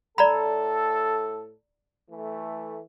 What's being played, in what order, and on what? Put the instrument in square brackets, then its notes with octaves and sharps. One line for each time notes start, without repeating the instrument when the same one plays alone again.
[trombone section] A2 A4 [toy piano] D5 A#5 B5
[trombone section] E3 A3